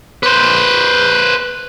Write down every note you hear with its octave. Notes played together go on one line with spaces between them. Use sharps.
B4 C5